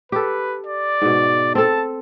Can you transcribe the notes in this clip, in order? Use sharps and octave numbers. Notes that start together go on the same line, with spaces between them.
G4 A4 B4
D5
G#2 B2
C4 A4 A5